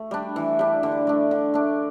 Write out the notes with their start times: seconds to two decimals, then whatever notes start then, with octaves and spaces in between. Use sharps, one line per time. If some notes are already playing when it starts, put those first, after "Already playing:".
Already playing: A3
0.11 G3 D4
0.36 E3
0.59 G3 D4
0.83 D3
1.07 A3 D4
1.31 D3
1.54 A3 D4